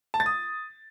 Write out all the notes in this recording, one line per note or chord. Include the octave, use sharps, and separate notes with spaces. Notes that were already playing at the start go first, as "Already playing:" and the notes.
A5
A6
D#6